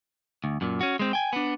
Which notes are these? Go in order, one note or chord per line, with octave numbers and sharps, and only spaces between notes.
D2
F#2 A#2
C#4 F#4
G#3 C4
G5 G#5
B3 D4